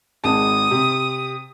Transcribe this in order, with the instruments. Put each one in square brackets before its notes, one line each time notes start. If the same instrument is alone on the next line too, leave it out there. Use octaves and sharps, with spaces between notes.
[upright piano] G#1 G#3 A5 [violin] D#6
[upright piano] C3